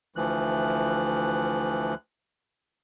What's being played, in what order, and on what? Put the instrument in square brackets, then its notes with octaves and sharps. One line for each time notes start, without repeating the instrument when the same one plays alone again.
[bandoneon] D2 E3 F3 F#6